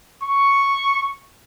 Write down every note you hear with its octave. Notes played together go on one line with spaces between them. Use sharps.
C#6